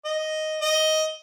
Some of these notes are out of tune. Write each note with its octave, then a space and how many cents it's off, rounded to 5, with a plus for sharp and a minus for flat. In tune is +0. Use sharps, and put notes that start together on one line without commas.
D#5 +0
D#5 +10